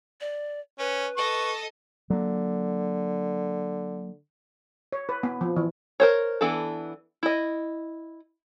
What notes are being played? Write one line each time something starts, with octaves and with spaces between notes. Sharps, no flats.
D5
C#4 B4
A4 D#5 C#6
D3 F#3 A#3
C#5
B4
B3
F3
E3
A#4 C5 C#5
E3 B3 D4 A4
E4 D#5